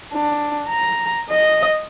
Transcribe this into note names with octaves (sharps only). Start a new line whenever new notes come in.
D4
A#5
D#5